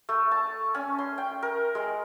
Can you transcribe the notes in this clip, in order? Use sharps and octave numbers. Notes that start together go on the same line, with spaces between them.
A3
A5
C#4
C6
G5
A#4
G#3